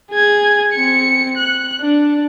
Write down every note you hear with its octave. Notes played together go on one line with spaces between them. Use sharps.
G#4 G#6
C4 C#7
F#6
D4